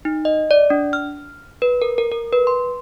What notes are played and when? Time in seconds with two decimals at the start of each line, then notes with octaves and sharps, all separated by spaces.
0.05 D#4
0.25 D#5
0.51 D5
0.70 D4
0.93 F6
1.62 B4
1.82 A#4
1.98 A#4
2.11 A#4
2.33 B4
2.47 C6